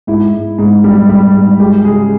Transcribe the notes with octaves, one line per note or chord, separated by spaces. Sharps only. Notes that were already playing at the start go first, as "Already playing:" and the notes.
G#2 E4
G#2
G#2
G3
G3
G#2
G#3 G4
C#3 G#4